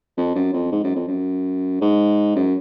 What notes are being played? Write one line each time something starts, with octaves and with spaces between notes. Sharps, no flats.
F2
F#2
F2
G#2
F#2
F2
F#2
G#2
F#2